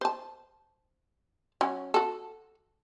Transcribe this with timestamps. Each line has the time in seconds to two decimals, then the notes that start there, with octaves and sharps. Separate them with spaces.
0.01 C5 A5
1.61 F#3 C#4
1.94 F#4 A4